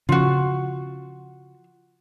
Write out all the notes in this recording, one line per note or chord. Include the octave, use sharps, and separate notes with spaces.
C#3 F3 F4 F#4